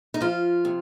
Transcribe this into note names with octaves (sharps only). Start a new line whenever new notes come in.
D#4
F3 F4
C3